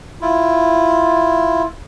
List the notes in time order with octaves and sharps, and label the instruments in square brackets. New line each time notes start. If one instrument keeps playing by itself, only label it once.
[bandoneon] E4 F4